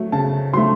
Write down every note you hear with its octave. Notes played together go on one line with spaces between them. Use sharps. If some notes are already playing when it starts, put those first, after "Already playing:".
Already playing: F#3 A3
C#3 A5
F#3 A3 C6